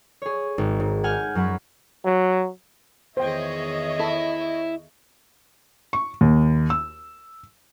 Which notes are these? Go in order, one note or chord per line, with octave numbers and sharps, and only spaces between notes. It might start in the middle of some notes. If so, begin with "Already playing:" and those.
G#4 C#5
G#1
G#2
F#5 G#5 F6 G6
F#2 F#3 F#5 B5
F#3
E2 D#3 G#4 C5 C#5 D#5 E5 G5
E4 A4 A5
C#6
D#2
E6